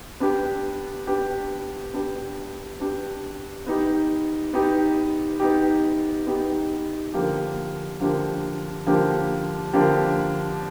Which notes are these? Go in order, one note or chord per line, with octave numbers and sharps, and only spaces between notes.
B3 D4 G4
B3 D4 G4
B3 D4 G4
B3 D4 G4
B3 D#4 G4
B3 D#4 G4
B3 D#4 G4
B3 D#4 G4
D3 F3 A#3 D4 G4
D3 F3 A#3 D4 G4
D3 F3 A#3 D4 G4
D3 F3 A#3 D4 G4